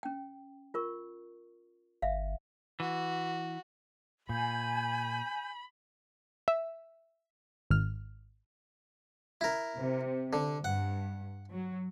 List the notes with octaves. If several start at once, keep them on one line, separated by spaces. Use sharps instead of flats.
C#4 G5
F4 A#4 C#6
G1 E5 F5
E3 F#4
A#2 G#5 B5 G6
E5
G#1 F6
E4 A#4
C3
D3
G2 F#5
F#3